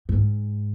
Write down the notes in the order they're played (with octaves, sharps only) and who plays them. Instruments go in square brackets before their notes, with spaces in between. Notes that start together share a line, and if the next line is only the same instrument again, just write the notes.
[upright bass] G#2